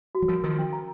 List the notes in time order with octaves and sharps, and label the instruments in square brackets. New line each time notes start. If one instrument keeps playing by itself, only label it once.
[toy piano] F#4
[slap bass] F#3
[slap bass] F3 G3 [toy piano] A#4
[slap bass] D#3 F3 [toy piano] A#4
[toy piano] C#4
A#5